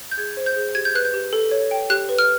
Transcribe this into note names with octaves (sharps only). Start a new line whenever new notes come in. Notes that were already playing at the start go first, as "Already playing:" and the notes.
G6
G#4 G#6
C5
G6
G#4
G4 G#6
G6
B4 F#6
G6
G4
A4
C#5
G5
G4 F#6
B4
F6